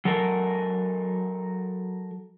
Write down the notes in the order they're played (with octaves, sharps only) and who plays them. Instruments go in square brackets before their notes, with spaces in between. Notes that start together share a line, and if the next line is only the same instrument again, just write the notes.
[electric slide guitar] F#3 A4 A#4